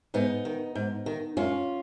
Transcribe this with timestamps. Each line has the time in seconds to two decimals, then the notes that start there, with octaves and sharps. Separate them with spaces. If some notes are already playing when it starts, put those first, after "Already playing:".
0.14 G#2 B3 D#4
0.45 D#3
0.75 G#2
1.06 D#3
1.37 F#2 C#4 F4